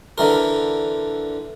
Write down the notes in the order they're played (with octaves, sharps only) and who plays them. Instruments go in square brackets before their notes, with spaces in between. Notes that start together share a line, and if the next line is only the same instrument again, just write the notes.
[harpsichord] D3 E3 A#4